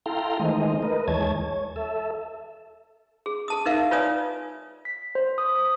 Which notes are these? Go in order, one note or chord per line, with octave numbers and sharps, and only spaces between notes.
E4 A4 F5 G5 A#5 C6
D#3 E3 G#3 A3 C5 D#5
A#4 B4 D#5
D#2 E3 G#3 C#5 A5 G#6
C#5
A4 E5
G#4
A4 A5 D#6
D#4 A#4 E5 F5
F4 B4 C#5 D5 G#5 D#6
B6
C5
D#6
D#6